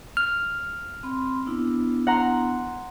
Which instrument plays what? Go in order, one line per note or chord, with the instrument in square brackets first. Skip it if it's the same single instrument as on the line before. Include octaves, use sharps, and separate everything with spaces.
[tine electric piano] F6
[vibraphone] C4 B5 C6
B3 D4 E4
[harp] F#5 A#5 C6